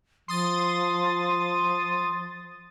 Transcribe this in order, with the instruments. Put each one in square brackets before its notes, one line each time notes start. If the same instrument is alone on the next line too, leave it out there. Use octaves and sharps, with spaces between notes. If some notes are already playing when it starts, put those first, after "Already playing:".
[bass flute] F3 [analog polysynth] C6 D#6 A6